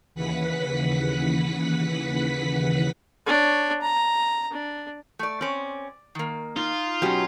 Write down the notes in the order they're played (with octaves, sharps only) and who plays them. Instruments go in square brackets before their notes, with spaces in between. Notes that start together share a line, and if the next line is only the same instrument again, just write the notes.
[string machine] D#2 C#3 E3 B4 F#5 B6
[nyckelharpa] D4 C#5
A#5
D4
[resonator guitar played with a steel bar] A3 D5
[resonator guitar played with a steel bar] C4 C#4 [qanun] D5
[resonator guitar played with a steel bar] D#3 A#3
[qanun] D#4 [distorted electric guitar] F4
[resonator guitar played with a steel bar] B2 G4 [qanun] F#3 C#4